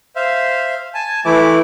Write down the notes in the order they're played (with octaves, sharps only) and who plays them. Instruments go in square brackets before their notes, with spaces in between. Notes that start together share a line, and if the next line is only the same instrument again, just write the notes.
[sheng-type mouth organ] C5 E5 F5
G#5 A5
[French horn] E3 [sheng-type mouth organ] A3 E4 D6